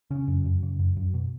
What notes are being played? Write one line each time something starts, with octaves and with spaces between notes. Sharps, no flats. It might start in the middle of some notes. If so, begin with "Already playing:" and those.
C#3 C#4
F#2
F#2
C#3
F#2
F#2
B2